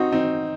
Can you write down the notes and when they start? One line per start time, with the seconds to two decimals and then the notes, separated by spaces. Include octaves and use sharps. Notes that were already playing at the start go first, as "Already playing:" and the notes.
Already playing: C4 D#4 F#4
0.12 C4 D#4